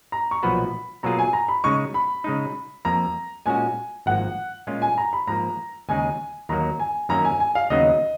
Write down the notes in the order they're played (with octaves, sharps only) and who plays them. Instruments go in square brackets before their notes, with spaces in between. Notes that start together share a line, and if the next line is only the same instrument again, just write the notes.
[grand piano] A#5
C#6
[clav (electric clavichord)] B1 A#2 F3 B3 F#4 [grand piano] B5
[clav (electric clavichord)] B2 F#3 A#3 F4 G#4 [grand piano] A#5
[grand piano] G#5
A#5
B5
[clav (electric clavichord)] C#3 G#3 D#4 [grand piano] C#6
[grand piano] B5
[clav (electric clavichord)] C#3 G#3 D#4
[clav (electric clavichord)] F2 F3 A#3 [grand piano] A#5
[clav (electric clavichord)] A#2 G#3 C#4 F#4 [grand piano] G#5
[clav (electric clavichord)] G#1 G#2 F3 A#3 [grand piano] F#5
[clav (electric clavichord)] A#2 G#3 C#4 F4
[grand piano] G#5
A#5
B5
[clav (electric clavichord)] G#2 F3 A#3 [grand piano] A#5
[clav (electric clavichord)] D#2 C#3 G#3 D#4 G#4 [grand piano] G#5
[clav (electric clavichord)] D#2 D#3 F#3 A#3 [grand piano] A#5
[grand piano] G#5
[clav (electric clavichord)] F#2 D#3 A#3 C#4 [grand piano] A#5
[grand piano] G#5
G#5
F5
[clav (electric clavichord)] D#2 C#3 F#3 B3 D#4 [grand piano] D#5